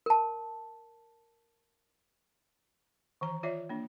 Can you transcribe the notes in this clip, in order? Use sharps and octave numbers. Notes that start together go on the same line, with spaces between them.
A#4 A5
D#3 E3 A#5
F4 C#5 D5 E5
A#3 D4